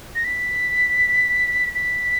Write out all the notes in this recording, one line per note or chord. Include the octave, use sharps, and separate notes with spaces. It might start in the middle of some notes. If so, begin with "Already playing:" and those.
A#6
B6
B6